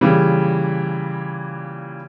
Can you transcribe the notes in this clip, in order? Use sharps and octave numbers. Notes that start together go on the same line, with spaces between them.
A#2 C#3 E3 G3